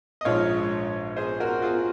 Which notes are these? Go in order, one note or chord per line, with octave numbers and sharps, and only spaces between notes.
D#5
A#1 G#2 F3 G#3 C#5 F5
G#4 C5
F#4 A#4
F4 G#4